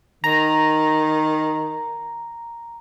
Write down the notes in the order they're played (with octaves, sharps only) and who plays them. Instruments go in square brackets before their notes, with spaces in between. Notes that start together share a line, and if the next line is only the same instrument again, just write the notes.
[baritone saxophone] D#3 [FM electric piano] A#5